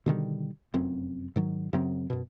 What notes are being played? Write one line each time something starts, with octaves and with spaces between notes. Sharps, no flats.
B2 D3 D#3 G3
F1 F#2 C4
G#2 D#3 F#3
F#2 C#3 F#3 C4
F#2 B2